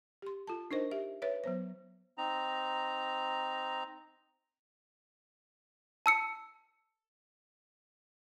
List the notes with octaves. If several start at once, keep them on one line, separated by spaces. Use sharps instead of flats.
G4 C6
F4 A4 A5
D4 D#4 A#4 C5 D#5
G4 E5
B4 C#5 E5
F#3 B3 C5
C4 D#4 A#5
A5 E6 C#7